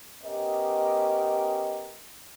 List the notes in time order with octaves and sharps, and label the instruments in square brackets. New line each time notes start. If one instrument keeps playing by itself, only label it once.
[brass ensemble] B3 C#4 G4 A#4 D#5